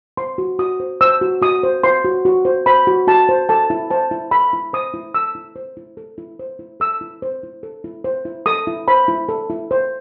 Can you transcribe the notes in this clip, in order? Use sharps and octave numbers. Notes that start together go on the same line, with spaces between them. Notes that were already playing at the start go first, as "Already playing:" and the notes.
C5 C6
F#4
F#4 D#6
C5
C5 E6
F#4
F#4 D#6
C5
C5 C6
F#4
F#4
C5
C5 B5
F#4
F#4 A5
C5
A4 A5
E4
C5 A5
E4
A4 B5
E4
C5 D#6
E4
A4 E6
E4
C5
E4
A4
E4
C5
E4
A4 E6
E4
C5
E4
A4
E4
C5
E4
A4 D#6
E4
C5 B5
E4
A4
E4
C5